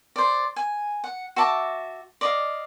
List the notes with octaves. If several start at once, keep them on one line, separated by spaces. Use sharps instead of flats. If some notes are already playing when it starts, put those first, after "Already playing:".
C5 D5
G#5
F#5
F#4 E5 A5 D6
D5 D#5 F5